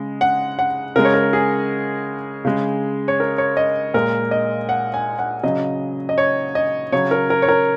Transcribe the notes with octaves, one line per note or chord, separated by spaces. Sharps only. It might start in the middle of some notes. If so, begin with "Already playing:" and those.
Already playing: C#3 G#3
F#5
F#5
C#3 G#3 A#4
C#5
A#4
G#4
C#3 G#3
C#5
A#4
C#5
D#5
A#2 G#3 A#4
D#5
F#5
G#5
F#5
C#3 F#3 D#5
D#5
C#5
D#5
C#3 F#3 C#5
A#4
A#4
C#5
A#4